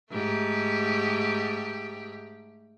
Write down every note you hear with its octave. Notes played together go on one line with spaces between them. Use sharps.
G#2 A3 G4